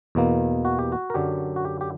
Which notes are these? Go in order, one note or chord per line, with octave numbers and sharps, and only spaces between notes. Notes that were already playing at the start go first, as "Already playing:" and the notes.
E2 B2 A#3
F#4
G4
F#4
A#4
F#2 D3 F#3 G4
F#4
G4
G4